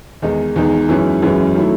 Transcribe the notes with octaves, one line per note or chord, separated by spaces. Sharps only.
E2 D#3 G#3 D#4
E2 D#3 G#3 D#4
F#2 E3 G#3 C#4 E4
F#2 E3 G#3 C#4 E4
D#3 F#3 A3 E4